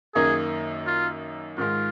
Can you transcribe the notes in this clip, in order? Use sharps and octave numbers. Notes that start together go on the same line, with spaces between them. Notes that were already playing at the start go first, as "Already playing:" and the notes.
F#2 D#3 A#3 D#4 G#4
F4
G#2 D#3 G#3 F4